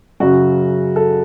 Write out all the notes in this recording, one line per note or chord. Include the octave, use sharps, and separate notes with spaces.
F#2 C#3 F#3 F#4
A4